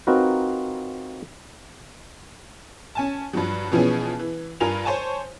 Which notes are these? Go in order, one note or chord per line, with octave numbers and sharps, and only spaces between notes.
C4 D#4 F4 F#4 A#4 B4
C#4 G#5 A5
G2 F3 F#3
B2 E3 F3 B3 C#4 G#4
E3
G2 F4 A#4 G#5 F7
C5 C#5 G#5 A5